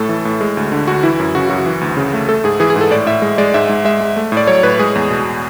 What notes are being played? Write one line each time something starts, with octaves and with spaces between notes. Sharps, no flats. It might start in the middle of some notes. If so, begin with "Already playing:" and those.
Already playing: A2 A3 A4
E3
A2
G#3
D2
D3
D2 F#4
E3 E4
F#2
C#3 F#4
F#2 F#4
E3
D2
C#3
A3
A3 A4
G#2 G#4
E3 G#4
G#4
G#2
A4
A2 D5
A2 E5
G#3
G#3 D5
G#2 E5
G#2
G#3 E5
G#3
A3
A2
D5
F#3 C#5
A2 B4
G#3 G#4
E2
B2